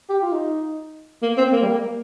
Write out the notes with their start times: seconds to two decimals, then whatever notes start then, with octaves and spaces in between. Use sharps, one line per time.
0.09 G4
0.22 F4
0.32 D#4
1.22 A#3
1.37 C4
1.52 A#3
1.62 G3
1.67 A#3